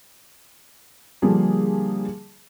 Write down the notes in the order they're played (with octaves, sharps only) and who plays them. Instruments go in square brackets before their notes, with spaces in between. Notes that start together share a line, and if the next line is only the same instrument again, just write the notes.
[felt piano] D3 F3 G3 A#3 D4 G#4